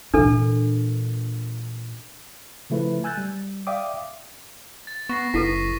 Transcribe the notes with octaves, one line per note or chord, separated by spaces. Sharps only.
A#2 E3 D4 A4
C#3 F3 A3 E4 B4
G#5 E6 F#6 G6 A6
G3
D5 E5 F5 G5 D6 D#6
A6
B3 C#6 A#6 C7
F#1 E4 A4 B4 B6 C7 D#7